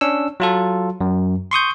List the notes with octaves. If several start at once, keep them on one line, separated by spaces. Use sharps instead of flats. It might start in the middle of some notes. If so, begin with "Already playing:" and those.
C#4 D4 E6
F#3 F4 A4
F#2
C6 C#6 D#6 G6